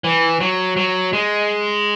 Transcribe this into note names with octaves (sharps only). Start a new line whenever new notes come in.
E3
F#3
F#3
G#3